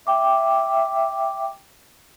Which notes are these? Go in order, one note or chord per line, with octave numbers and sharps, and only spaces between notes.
E5 G5 D6